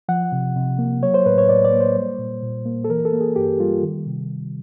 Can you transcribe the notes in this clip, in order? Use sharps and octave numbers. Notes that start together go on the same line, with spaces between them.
F3 F#5
C3
C3
A#3
F#3 C#5
C5
A2 B4
C#5
A2 D5
D5
A#3
C5
G3
A#2
A#2
A#3
A4
E3 A#4
A4
A#3
G#4
G2 G4
G3 F4
D#3
C3